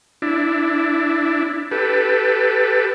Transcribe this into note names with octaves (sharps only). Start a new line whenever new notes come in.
D4 E4
G4 A4 B4